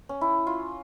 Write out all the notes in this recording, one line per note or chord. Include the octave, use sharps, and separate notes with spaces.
C#4
E4
F4